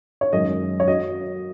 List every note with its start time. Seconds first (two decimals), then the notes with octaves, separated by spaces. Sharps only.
0.21 C#5
0.33 F#2 D#3 G#3 D#5
0.80 C#5
0.87 F#3 D#5